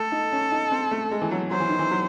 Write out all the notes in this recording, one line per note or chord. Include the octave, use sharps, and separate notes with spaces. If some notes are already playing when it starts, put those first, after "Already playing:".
Already playing: A3 A4
D#4
C#4
D#4
C4
A3
G#3
E3
F#3
F#3 C5
E3
D#3
E3
F#3